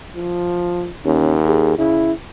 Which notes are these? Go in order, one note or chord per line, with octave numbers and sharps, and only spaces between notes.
F3
D#2 C#4
G#4
C#3 E4